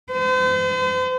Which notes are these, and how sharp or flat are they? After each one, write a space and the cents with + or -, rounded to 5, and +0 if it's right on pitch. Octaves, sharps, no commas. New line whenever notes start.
C5 -40